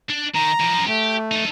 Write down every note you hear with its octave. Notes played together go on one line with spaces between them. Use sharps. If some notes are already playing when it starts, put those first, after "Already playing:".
D4
D#3 A#5
E3 F3
F#2 F3
A3 G4
D#4 A4